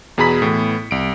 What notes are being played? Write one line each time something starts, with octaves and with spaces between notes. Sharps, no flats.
E2 B2 G#4 A#5 B5 B6
A2 E3 B3
C2 D7